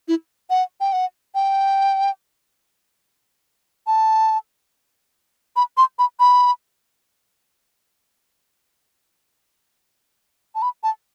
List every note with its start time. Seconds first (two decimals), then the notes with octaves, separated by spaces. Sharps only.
0.08 E4
0.50 F#5
0.81 G5
0.93 F#5
1.35 G5
3.87 A5
5.56 B5
5.77 C6
5.99 B5
6.20 B5
10.55 A5
10.62 B5
10.83 A5